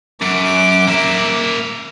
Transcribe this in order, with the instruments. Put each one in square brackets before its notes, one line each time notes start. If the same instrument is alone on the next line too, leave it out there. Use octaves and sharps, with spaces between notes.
[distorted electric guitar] F#2 [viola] D6
[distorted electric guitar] A#3 E5